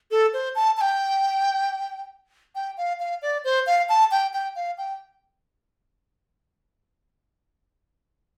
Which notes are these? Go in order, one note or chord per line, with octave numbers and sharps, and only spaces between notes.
A4
C5
A5
A5
G5
G5
F5
F5
D5
C5
F5
A5
G5
G5
F5
G5